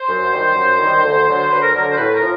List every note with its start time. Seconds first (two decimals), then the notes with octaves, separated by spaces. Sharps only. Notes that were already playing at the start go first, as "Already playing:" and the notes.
Already playing: C5
0.08 F#2
0.32 D#3 G3
0.55 F#2
0.79 D#3 G3
1.03 D2
1.26 D3 F#3
1.50 D2 B4
1.62 A#4
1.74 D3 F#3 A#4
1.91 C5
1.97 A2 B4
2.13 A#4
2.21 F3